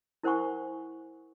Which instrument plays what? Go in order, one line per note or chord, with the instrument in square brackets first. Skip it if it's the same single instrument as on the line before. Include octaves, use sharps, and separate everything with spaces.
[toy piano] E4 A#4 C5 F#5 G#5 C#6